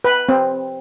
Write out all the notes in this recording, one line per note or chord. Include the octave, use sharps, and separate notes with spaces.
B4
C4